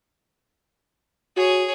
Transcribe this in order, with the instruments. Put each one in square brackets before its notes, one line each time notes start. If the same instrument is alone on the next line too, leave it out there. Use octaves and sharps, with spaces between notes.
[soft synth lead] F#4 [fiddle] G#4 C#5